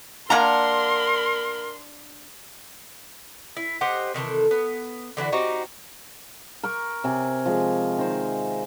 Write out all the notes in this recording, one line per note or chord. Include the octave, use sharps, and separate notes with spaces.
A#3 D4 A#4 F#5 A#5 C6
E4
G4 C5 D#5 F#5
C3 D#3 E3 A4
B3
D3 E3 E4 F#4
C4 D#4 F#4 G4
A#4 C#6 D6
C3 G#5 D6
F3 G#3
D#3 C5